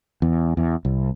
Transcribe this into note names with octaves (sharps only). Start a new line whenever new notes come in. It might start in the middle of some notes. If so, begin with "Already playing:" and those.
E2
E2
C2